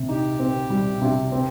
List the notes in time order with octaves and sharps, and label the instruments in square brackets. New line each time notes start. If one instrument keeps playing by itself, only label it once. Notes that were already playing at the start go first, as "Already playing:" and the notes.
Already playing: [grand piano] C3
[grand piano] D#4 [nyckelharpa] G4
[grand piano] C4
G3
C3
C4